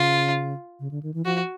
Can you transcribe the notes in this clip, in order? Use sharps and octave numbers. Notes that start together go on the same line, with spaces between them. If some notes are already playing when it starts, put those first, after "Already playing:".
Already playing: C#3 F4
C#3
D3
D#3
E3
F3 F#4